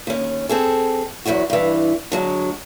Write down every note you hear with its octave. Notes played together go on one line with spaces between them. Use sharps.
D#2 C#4
C4 G#4 A4
E2 G2 F#3 E4 F#4
G2 E3
D3 F#3 G#3